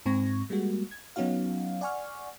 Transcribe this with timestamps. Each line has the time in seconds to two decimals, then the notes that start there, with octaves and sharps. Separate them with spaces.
0.06 G#2 C4 C#6 G#6 A#6
0.50 G3 G#3 A#3 F#4
0.91 G#6
1.16 F#3 B3 C#4 D#4 F#4 F5
1.81 D5 F#5 G#5 C#6 F6